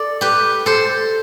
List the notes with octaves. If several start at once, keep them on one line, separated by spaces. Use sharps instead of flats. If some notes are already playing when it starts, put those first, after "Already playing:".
Already playing: A4 D5
G4 B4
A4 C5